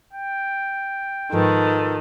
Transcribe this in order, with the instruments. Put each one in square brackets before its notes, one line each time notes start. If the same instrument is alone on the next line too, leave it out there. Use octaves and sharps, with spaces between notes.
[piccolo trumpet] G5
[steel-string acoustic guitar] G#2 F3 [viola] D#3 [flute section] A4 B4 A5